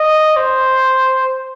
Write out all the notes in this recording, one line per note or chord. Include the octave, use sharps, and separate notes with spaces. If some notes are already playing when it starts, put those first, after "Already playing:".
Already playing: D#5
C5